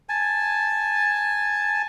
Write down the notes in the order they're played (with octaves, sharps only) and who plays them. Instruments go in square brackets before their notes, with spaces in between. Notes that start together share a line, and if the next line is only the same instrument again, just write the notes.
[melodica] G#5 A5